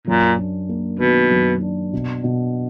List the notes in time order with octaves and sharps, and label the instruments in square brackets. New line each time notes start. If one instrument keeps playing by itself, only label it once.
[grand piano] F#2 [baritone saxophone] A#2
[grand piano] D4
A#3
[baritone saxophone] B2 [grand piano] D#3
[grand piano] F#2
D4
B2
B2